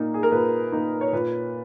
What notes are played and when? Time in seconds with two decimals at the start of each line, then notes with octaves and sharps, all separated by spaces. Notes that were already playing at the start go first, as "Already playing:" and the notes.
Already playing: A#2 A#3 D#4
0.14 G#4
0.23 A#4
0.32 A#2 B4
0.72 A#3 D#4
1.01 C#5
1.13 A#2 B4